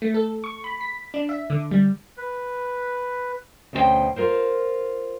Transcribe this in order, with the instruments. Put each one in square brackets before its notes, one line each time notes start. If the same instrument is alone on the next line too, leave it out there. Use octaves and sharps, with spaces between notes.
[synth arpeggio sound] A3
A4
C#6
B5
B6
D4
E5
D3
G3
[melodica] B4
[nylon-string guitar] D2 B2 C#4 F#4 C5 G5
F4 A#4 C5